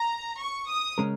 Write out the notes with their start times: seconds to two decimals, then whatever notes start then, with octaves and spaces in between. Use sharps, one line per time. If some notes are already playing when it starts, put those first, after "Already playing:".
Already playing: A#5
0.40 C#6
0.69 D#6
0.98 C#3 G#3 C#4 A#4